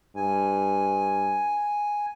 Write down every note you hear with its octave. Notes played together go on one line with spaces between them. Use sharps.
G2 G#5